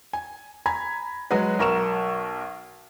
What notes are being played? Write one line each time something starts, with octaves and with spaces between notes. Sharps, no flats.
G#5
G#5 A#5 B5 G#6
F#3 G#3 F#4 G#4 B4
B1 A#4 C#6 E7